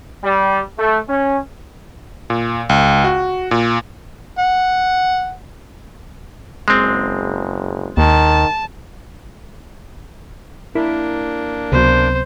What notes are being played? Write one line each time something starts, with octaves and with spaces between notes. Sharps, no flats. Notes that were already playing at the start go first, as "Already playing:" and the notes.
G3
A3
C#4
A#2
C#2
F#4
A#2
F#5
F#1 G#3 C4
D#2 D#3 A5
A#3 D4 E4 A#4 E5
C#2 C3 F#3 B3 C5